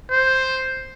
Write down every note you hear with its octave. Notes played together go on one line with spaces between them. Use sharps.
C5